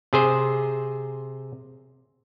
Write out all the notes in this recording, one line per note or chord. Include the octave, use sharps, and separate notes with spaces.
C3 G#4 C5